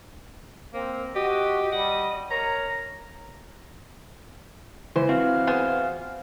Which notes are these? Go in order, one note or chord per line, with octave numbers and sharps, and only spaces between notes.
A#3 C4
F#4 G4 D#5
G3 F#5
A#4 C#5 A#5
C#2 E3 C5
C4 F4 F#4 F5
B3 G#4 C5